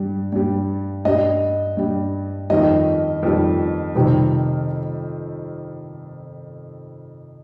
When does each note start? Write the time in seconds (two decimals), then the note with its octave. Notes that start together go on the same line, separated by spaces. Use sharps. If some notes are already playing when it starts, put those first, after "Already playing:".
Already playing: G2 G3
0.33 G2 G3
1.05 G2 G3 D#5
1.77 G2 G3
2.50 F2 D#3 G3 D#5
3.23 F2 D#3 G3
3.95 F2 C3 D#3 G3